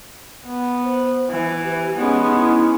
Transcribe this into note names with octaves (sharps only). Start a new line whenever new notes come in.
B3
C5
E3
G4
G#3 B3 C#4 D#4
E4